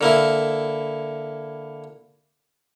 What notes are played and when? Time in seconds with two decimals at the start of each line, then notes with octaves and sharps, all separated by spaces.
0.01 D3 A#3 E4